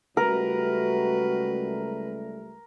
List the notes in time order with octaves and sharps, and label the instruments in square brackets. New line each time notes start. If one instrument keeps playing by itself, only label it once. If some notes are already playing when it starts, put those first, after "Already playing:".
[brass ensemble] C#2 G3 A3 [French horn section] F#4 [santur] A#4 [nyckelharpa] B4